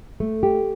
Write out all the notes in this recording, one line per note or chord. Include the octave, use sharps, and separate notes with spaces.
A3
G4